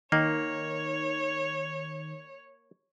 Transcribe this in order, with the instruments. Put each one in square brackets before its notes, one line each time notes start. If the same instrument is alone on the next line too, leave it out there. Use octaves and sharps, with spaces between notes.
[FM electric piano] D#3 [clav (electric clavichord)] A#3 [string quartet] C#5